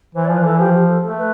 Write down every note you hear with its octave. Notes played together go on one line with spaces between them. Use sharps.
E3 C5
D5
F3 B4
E3 A4
F3 G4
G4
A4
A3 A4
B4